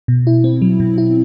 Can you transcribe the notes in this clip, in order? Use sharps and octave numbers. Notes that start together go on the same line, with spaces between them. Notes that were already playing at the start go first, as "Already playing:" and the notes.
B2
E4
C4
F#3
B2
E4